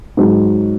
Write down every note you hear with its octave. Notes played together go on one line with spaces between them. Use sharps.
G#2 F#3 D#4